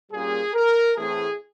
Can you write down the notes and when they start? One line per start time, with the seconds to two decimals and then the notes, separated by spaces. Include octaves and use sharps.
0.11 A#2 G3 A#3 C#4 G#4
0.55 A#4
0.97 A2 E3 A3 C4 G#4